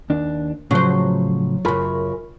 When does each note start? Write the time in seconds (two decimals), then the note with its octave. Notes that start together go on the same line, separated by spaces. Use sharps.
0.10 D#2 D4
0.71 A2 C#3 F3 F#3 C5
1.65 F#2 C#3 F4 A#4 B5